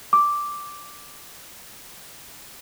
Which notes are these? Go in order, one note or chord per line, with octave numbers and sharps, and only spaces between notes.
D6